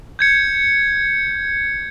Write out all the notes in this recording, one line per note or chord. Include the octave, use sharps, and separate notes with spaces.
G6 G#6 C#7